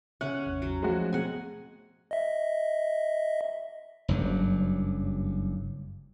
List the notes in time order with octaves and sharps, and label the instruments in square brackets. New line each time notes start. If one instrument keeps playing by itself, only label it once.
[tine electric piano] C#3 E5 [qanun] C#4 F#5 [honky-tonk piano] F#6
[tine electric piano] A1 E2
[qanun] F#3
[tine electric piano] F3 A3 [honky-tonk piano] G#3 F#4
[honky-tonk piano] B2 [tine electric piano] C4 G#4 [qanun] F#5 G#5
[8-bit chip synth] D#5 E5
[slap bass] F#1 G2 F#3 G3